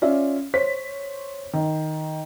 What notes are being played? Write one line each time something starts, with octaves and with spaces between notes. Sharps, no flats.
C#4 F4 D5 E5
C5 C#5 B6
D#3